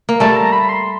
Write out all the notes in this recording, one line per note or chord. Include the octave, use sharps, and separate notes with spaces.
A#3
G3 A3 A5
A#5
B5
C6